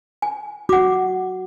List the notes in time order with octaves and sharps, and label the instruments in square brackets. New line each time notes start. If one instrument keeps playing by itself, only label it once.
[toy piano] G#5
[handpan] F#4 [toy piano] F#5 D6